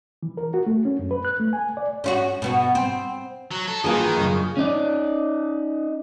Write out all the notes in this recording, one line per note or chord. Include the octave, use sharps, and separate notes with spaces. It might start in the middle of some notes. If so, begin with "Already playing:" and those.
E3
A#4
F#4
A3
C#4
F#2
B4
F#6
A3
G#5
D5
C#4 F4 F#4
B2 B3 F#4
C4
F#3
A4
D#3 E3 A#3 F4 F#4 G#4
F#2 A2 C#3
C#4 D#4 D5